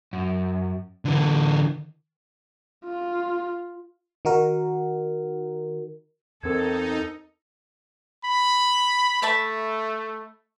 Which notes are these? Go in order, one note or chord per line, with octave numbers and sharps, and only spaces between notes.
F#2
D3 E3
F4
D#3 D#4 F#4 A#4
E2 C4 D#4 A4 A#4 G#6
B5
A3 E5 A5 B5